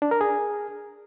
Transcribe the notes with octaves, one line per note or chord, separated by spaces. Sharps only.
D4
A#4
G#4